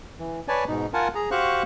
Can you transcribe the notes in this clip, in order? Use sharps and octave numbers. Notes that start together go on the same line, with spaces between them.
E3
B4 C#5 D5 G#5 A5
G#2 B2 D#4
F4 A#4 F#5 G#5 A5
G#4 A#5
F#4 G4 C5 F5 C#6 F#6